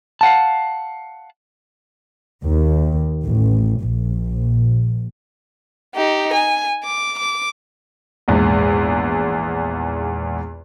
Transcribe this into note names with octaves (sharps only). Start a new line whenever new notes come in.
F5 F#5 A5
D#2
A1
A#1
D#4 G4
G#5
D6
D6
A#1 E2 G#2